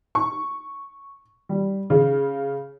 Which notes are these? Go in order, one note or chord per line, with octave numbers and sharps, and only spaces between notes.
C#6
G3
C#3